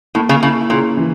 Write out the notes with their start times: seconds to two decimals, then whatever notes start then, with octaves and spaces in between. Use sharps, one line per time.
0.15 A2 A#3
0.29 C#3
0.42 C#3 E4
0.70 A#2 C#3
0.97 E3